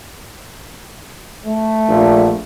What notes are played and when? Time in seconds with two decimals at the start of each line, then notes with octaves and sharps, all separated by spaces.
1.45 A3
1.88 A#1